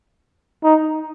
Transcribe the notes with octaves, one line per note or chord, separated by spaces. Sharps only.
D#4